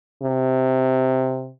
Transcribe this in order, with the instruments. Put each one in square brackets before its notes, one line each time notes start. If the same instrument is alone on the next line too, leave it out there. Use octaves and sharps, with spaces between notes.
[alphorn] C3